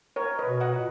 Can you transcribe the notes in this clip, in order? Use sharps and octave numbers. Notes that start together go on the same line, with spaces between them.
A#4 C#5
B4 D#5
B2
D#5 F#5
A#2